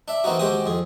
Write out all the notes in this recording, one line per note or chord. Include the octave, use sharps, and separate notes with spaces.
D4 E5
E3 A#3 C4 D#4 F#4
D#2 G#3 C4 F#4 G4 D#6
F2 G#4